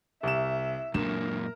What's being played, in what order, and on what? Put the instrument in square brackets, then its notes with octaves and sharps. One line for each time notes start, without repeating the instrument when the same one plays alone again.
[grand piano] C2 E7 [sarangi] E5
[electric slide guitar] F#2 A#2 [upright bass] D4 [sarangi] A#4 [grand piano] E7